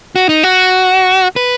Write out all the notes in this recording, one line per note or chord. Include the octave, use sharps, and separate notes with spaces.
F#4
D#4
F#4
B4